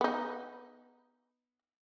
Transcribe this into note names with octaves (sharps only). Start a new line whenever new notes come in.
B3 D#4